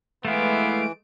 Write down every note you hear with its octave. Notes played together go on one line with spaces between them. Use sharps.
E3 G#3 A3 B3 E4 F5 D7